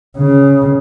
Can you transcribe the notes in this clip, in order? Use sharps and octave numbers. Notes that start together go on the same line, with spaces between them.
C#3